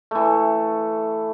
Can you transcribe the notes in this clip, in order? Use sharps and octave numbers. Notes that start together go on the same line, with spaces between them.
E3 A3